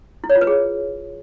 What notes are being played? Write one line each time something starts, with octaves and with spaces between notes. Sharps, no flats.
E4
C#5
F4
B4
G#4